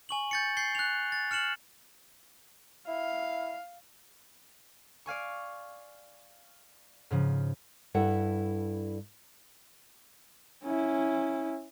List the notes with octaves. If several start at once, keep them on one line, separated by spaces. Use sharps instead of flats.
G#5 C#6 F#7
G6 A6 C#7
G6 A6 C7 G7
F#6 F7
A6
F6 C#7 E7 F#7
E4 F5
D5 F5 G#5 C#6
G#2 C#3 F3
G2 E4 A4 F#5
C#4 E4